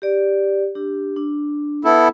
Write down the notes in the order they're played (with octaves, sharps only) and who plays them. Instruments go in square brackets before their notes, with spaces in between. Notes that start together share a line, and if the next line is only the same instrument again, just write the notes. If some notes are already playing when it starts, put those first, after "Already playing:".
[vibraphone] G4 D5
D4 G4
D4
[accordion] B3 E4 A4